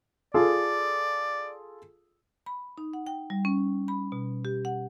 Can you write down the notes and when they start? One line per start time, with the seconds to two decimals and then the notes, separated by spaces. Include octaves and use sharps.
0.34 F4 G#4 A4 D5
2.46 B5
2.78 D#4
2.93 F#5
3.07 G5
3.30 G3
3.45 C#4
3.88 B5
4.12 B2
4.45 G4
4.65 F#5